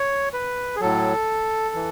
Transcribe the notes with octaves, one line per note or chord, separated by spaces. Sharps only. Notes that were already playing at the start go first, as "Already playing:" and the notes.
Already playing: C#5
B4
G#4
A2 F#3 A4
E3